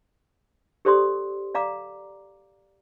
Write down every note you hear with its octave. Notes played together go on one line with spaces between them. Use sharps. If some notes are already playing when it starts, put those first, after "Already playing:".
G4 A4 C5 D5 C6 D#6
D5 F5 A#5 D6